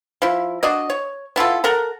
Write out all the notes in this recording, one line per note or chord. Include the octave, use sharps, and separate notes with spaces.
F3 E4
D4 F#4 D5 D#5
C#5
B3 E4 F4 A4
A4 A#4 F#5 A#5